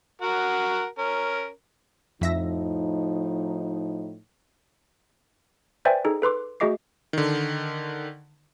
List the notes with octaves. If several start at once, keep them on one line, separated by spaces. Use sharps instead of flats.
F#4 A#4 F#5
C#4 A#4
F2 A2 F3 D#4 E5 A#6
B4 C5 D5 E5 G5 G#5
D#4 G#4 A4
A4 B4 C6 D6
A3 F#4 G#4 D#5 D6 C7
D3 D#3